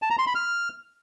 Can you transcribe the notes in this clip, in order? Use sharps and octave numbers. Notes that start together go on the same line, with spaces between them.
A5
A#5
C6
B5
F6